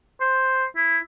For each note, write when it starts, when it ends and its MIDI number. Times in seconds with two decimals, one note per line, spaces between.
0.20 0.65 72
0.76 0.98 64